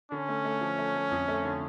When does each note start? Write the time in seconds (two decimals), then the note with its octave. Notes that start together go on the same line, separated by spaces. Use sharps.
0.11 D3 C#4
0.29 A3
0.45 A3
0.61 F3
0.78 A3
0.96 A3
1.11 F2
1.28 A3
1.45 D3